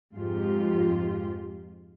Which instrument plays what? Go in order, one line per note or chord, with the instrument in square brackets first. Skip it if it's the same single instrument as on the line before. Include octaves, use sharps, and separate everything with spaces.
[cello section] F2 G#2 G#3 F4 G4